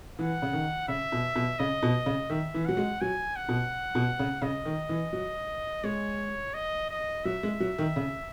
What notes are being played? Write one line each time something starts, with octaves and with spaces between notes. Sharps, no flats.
E3 F#5
C#3
D#3
C#3 E5
B2
B2
C#3 D#5
B2
C#3
D#3 E5
E3
F#3 F#5
G#3
F#3 G#5
F#5
B2
B2
C#3
C#3 D#5
D#3
E3
F#3
G#3 C#5
D#5
D#5
F#3 E5
G#3
F#3
D#3
C#3